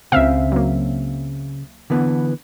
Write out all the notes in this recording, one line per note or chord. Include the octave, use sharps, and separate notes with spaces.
C#2 C#3 C4 E5 F5
F#3 A#3
D3 E3 B3